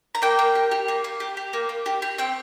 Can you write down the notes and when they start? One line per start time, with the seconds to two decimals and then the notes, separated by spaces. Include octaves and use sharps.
0.15 A#5
0.22 A#3 G5
0.39 A#3
0.55 G4
0.71 G4
0.88 A#3
1.04 A#3
1.20 G4
1.37 G4
1.53 A#3
1.69 A#3
1.86 G4
2.02 G4
2.18 C4 G5